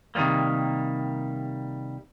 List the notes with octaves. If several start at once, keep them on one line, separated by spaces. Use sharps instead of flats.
C3 D#3 F#3 G3 A#3